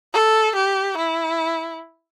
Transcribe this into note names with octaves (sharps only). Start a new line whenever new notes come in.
A4
G4
E4